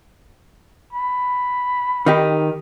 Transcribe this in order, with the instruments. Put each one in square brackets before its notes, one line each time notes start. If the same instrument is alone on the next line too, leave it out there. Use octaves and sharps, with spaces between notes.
[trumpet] B5
[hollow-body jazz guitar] D#3 D#4 G4